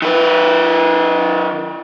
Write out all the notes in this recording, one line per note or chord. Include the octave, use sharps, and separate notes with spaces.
D#3 B4